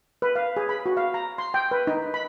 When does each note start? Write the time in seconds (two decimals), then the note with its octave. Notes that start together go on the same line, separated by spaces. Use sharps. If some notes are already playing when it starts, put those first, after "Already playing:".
0.22 B4
0.35 F5
0.57 G#4
0.69 B5
0.86 F#4
0.97 F5
1.14 A#5
1.38 C6
1.54 G5
1.71 B4
1.87 D#4
2.14 B5